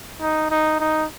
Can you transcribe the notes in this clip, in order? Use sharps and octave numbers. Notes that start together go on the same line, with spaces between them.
D#4
D#4
D#4